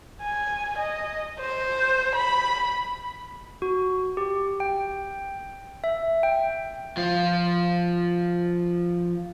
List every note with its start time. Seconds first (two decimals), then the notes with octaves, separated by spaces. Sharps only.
0.22 G#5
0.78 D#5
1.40 C5
2.15 B5
3.62 F#4
4.17 G4
4.60 G5
5.84 E5
6.23 G5
6.97 F3 F4